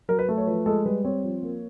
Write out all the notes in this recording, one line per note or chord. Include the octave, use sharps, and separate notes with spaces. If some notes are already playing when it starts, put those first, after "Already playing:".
F#3 A#4
B4
A3
C#5
F3 B4
G#3 A4
G3 B4
C4 C#5
F3
A#3